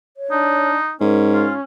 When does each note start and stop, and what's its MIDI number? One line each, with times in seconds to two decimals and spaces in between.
0.17 0.70 73
0.31 0.77 62
0.31 0.93 63
1.01 1.52 44
1.01 1.64 61
1.01 1.46 70
1.33 1.54 65